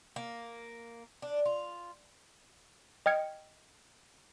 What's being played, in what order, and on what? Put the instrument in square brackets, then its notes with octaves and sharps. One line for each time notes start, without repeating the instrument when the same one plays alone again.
[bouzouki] A#3
D4
F4
[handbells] D#5 G5 F6 G#6 C#7